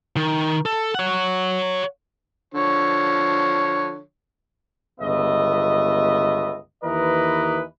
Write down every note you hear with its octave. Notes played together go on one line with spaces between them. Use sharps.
D#3
A4
C#5 F#5
D3 F3 C#5
G1 C#2 B3 D#5 E5
D#2 E3 A#4 B4 D#5